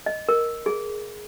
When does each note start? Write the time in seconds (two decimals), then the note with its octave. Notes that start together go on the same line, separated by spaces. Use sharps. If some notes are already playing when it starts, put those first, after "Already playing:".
0.06 D#5
0.29 A#4
0.66 G#4